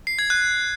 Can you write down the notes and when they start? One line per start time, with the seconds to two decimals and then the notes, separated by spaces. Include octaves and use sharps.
0.07 C7
0.19 G#6
0.30 F#6